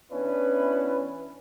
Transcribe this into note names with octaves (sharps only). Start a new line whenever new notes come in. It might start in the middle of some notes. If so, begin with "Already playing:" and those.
E3 B3 C#4 D4 E4 B4